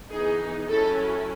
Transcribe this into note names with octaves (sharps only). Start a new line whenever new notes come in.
E3 B3 D#4 G#4
F#3 C#4 E4 A4